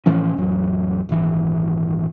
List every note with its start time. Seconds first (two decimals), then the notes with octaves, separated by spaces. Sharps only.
0.06 A2 E3 F3 C#4
0.37 A1 F2 F#3
1.09 D#1 G#1 E3